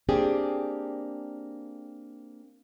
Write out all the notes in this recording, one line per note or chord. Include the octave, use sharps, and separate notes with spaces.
A#3 C4 D4 G4 G#4